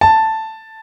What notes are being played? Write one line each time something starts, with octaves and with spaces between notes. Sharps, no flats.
A5